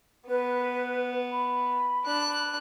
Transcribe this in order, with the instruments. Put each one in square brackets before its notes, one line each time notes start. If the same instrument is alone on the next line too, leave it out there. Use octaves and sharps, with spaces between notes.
[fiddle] B3 [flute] B4
[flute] B5
[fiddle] D4 F#6